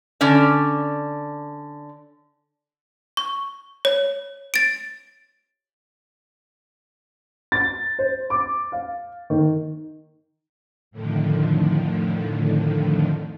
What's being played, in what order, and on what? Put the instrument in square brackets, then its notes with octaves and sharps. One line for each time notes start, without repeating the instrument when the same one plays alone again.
[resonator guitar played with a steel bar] D3 C#4 D5
[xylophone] C#6
C#5
A6 D7
[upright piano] A6
C5
D6
F5
D#3
[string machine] F2 A2 D3 D#3 F3